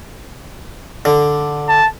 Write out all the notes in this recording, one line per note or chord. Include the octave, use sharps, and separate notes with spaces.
D3
A5